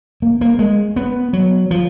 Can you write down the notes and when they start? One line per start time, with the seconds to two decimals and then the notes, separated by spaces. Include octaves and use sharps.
0.22 A#3
0.41 A#3
0.59 G#3
0.96 B3
1.33 F#3
1.71 F3